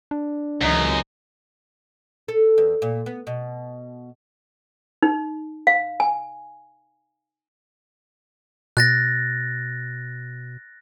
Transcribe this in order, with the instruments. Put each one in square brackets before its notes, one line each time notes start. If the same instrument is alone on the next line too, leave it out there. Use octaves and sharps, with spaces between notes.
[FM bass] D4
[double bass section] C#2 C3 E3 [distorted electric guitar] F#2 [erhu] D#4
[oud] A4
E2
A#2
B3
B2
[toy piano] D#4
F5
G#5
[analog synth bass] B2 [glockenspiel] F#6 A6 A#6